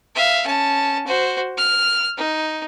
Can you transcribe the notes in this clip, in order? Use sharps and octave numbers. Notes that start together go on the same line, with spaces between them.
E5 F5
C#4 A5
F#4 C5
F6
D#4